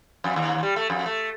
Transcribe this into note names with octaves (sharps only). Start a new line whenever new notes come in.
F2
D#2
G3
A3
F2
A3